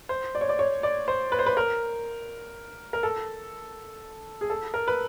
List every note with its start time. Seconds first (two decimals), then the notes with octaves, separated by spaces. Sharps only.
0.09 C5
0.35 D5
0.41 C#5
0.49 D5
0.59 C#5
0.83 D5
1.08 C5
1.32 B4
1.39 C5
1.46 B4
1.57 A#4
2.93 A#4
3.03 A4
4.41 G#4
4.50 A4
4.74 A#4
4.88 B4